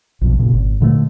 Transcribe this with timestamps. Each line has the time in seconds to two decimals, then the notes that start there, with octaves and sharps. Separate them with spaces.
0.21 A#1 F#2 B2
0.39 A#2 C#3
0.53 G#1
0.80 A#2 D3 D#3 A3